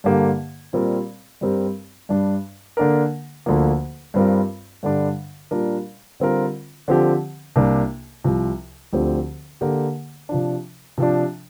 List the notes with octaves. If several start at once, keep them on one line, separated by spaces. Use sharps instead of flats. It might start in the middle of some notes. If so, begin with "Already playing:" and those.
G2 D3 A#3 G4
A#2 G3 C4 A#4
G2 G3 C4 G4 A#4
G2 G3 D4
D3 A#3 D4 A#4
D2 D3 F3 A#3
G2 G3 C4 F4 A#4
G2 D3 G3 D4
A#2 G3 D4 A#4
D3 G3 C4 F4 A#4
D3 F3 C4 G4
C2 C3 A#3 D4
C2 C3 F3
D2 D3 F3 C4 G4
D3 A#3 G4 A#4
C3 F3 D4
C3 F3 D4